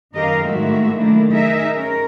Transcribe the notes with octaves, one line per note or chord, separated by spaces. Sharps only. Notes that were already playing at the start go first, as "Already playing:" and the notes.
F#2 D#3 G4 A#4 D#5 F5
A2 D#3 G#3 A#3 F#4 E5
D#3 F#3 A3 A#3 D4 E4
D#4 G#4 A#4 D#5 E5
C#4 A#4